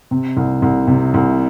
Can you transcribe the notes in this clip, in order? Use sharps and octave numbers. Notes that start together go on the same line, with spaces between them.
C3
C2
C2
C3
C2